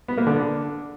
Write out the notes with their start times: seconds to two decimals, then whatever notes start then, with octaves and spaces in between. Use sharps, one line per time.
0.08 B3
0.18 A#3
0.27 D3